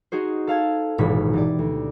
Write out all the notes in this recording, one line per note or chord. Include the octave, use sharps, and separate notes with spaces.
D#4 F#4 G#4 C5
A4 F5 A5 G#6
D#1 G#1 B2 E3 B6
E3 G4 D5
D2